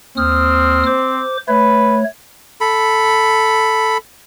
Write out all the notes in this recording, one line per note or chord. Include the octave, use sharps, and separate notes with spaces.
D#2 C4 D#6 F6
C5 D6
A3 B4 C#5
A4 B5